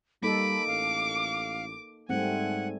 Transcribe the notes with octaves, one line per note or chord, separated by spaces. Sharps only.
G3 A#3 D#4 A4 B5 D6
A1 F5
G#2 G3 A3 C4 F#5 G#5